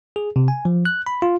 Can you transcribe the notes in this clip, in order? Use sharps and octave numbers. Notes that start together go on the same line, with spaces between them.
G#4
C3
G#5
F3
F#6
B5
F4